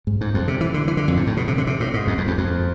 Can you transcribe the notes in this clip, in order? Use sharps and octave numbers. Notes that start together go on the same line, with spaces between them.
G#2
G#2
F2
C3
E3
D3
E3
D3
F2
G#2
A2
B2
C3
D3
C3
A2
G#2
F2
F2
E2
F2